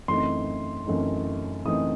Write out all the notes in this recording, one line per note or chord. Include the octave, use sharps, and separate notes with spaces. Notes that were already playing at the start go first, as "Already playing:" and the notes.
F#2 E3 A3 C4 D#4 C6
F#2 E3 A3 C4 D#4
F#2 E3 A3 C4 D#4 D#6